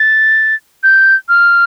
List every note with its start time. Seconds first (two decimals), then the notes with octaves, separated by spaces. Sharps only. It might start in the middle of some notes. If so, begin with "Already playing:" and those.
Already playing: A6
0.83 G6
1.29 F6